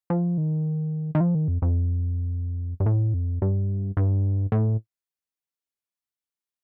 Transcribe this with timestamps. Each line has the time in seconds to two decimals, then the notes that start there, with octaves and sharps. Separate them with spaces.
0.10 F3
0.38 D#3
1.15 D#3
1.20 F3
1.35 D#3
1.48 F2
1.62 F2
2.80 G2
2.86 A2
3.14 F2
3.42 G2
3.97 G2
4.52 A2